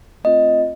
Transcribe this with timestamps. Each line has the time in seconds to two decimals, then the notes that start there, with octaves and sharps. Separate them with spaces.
0.24 A3 C4 F4 D#5